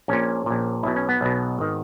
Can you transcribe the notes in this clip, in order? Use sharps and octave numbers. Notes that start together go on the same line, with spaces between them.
A#1 A#2 C#4
A#1 A#2
B1 B2 E4
C#4
B3
B1 B2
G#1 D#3